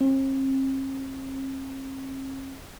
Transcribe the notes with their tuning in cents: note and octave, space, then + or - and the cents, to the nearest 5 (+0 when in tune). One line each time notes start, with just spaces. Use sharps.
C4 +45